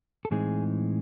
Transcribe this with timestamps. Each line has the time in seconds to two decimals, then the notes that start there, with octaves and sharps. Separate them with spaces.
0.25 A4
0.31 A2 E3 G#3 C4 D#4 G#4